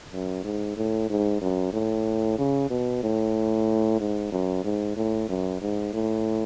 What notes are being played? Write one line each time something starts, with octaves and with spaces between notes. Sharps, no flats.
F#2
G#2
A2
G#2
F#2
A2
C#3
B2
A2
G#2
F#2
G#2
A2
F#2
G#2
A2